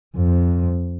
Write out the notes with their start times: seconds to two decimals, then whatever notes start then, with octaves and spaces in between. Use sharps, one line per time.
0.16 F2